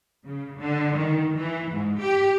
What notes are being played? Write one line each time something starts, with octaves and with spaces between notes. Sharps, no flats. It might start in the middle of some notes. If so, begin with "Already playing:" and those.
C#3
D3
D#3
E3
G#2
G4